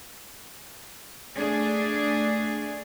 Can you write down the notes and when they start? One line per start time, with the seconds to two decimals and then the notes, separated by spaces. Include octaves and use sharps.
1.35 A3 D4 G#4